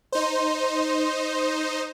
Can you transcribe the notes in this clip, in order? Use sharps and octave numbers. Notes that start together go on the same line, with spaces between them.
D#4 C5